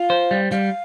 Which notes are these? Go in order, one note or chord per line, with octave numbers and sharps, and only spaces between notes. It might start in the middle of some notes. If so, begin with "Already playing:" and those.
Already playing: F4 F5
C5
G3
G3 F5